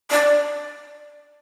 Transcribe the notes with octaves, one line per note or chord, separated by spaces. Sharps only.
D5